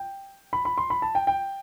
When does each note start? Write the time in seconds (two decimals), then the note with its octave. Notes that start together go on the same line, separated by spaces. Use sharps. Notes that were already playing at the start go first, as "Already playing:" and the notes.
Already playing: G5
0.53 B5
0.65 B5
0.78 C6
0.90 B5
1.02 A5
1.15 G5
1.27 G5